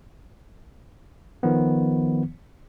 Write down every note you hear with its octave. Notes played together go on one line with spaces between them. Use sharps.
D#3 F3 B3